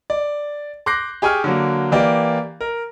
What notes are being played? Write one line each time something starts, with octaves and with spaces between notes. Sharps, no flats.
D5
C6 D6 F#6 G6 A#6 C7
G4 G#4 G#5 C#6 F6
D3 F#3 A#3
E3 A#3 G4 D5
A#4